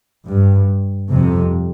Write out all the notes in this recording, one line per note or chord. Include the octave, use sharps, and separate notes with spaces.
G2
F2 C3